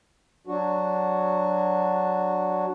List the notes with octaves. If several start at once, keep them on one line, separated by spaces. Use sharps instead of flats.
F#3 D4 F#4